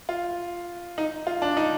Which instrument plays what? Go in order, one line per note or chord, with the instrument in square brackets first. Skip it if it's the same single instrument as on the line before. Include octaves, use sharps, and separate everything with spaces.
[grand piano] F4
D#4
F4
D4
D#4